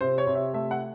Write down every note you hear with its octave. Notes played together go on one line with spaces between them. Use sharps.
C3 C5
C#5
C3
E5
A3 E5
F#5